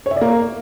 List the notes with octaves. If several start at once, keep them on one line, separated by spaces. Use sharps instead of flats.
C#5
E5
D5
A#3